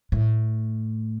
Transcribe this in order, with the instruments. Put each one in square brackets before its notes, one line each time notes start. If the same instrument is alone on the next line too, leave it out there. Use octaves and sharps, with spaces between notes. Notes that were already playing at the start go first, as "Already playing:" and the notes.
[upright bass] A2